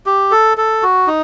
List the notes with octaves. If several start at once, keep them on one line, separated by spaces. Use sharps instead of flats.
G4
A4
A4
F#4
D#4